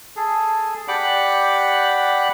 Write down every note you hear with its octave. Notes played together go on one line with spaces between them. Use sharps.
G#4 A4
G4 D5 F#5 B5 D6 F#6